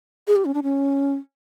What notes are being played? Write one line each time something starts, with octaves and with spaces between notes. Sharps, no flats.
G#4
G4
C#4
D4
C#4